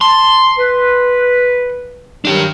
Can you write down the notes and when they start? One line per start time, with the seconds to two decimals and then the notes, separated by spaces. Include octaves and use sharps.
0.01 A5 C6
0.58 B4
2.25 D#3 F#3 D4 G4